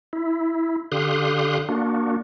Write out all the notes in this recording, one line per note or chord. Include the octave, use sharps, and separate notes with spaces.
E4
D3 G4 F5 C6 D#6 F#6
A#3 D4 F#4